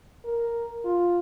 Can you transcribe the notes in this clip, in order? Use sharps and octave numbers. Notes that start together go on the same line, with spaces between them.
A#4
F4